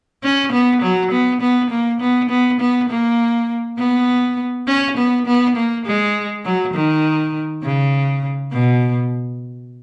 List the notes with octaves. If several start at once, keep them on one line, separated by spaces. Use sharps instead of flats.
C#4
B3
F#3
B3
B3
A#3
B3
B3
B3
A#3
B3
C#4
B3
B3
A#3
G#3
F#3
D#3
C#3
B2